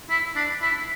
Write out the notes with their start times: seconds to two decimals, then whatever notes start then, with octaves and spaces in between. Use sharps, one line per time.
0.10 E4
0.36 D4
0.62 E4